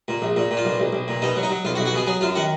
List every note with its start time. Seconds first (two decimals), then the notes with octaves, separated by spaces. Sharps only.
0.08 A#2
0.22 A#1
0.37 A#2
0.51 A#2
0.57 F4
0.65 B1
0.80 B1
0.93 B1
1.08 A#2
1.22 B2 D#4
1.36 F#3
1.43 D#4
1.50 F#3
1.65 B1 F4
1.75 F#4
1.78 B1
1.86 F#4
1.94 B2 G#4
2.07 F#3 G#4
2.21 F#2 F4
2.35 D#3 F#4